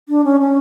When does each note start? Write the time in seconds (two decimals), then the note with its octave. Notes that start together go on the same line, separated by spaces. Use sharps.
0.09 D4
0.24 C#4
0.40 C#4